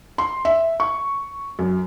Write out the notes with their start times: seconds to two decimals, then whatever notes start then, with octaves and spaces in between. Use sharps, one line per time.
0.18 C6
0.45 E5
0.80 C#6
1.59 F#2